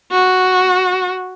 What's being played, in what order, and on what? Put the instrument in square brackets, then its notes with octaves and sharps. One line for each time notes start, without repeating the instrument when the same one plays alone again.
[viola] F#4